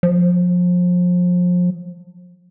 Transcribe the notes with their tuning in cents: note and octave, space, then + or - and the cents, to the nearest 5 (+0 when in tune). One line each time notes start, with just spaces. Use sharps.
F3 +30